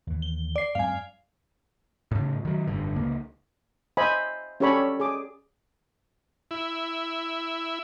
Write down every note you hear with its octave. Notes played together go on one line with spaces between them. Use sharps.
D#2 E3
G7
D5 C7
F#2 G#3 C4 F5 G#5
A2 C#3
D#3 F#3
F1 G2 D3
C#2 A#3
C5 D#5 E5 G#5 B5
C#4 G4 A4 C#5 D5 B5
G#4 D6
E4